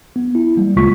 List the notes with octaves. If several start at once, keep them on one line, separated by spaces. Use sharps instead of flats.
B3
E4
G3 A#3
D2 C#3 G#3 F4 C#6 B6